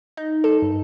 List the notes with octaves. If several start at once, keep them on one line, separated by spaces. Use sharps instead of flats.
D#4
A4
G2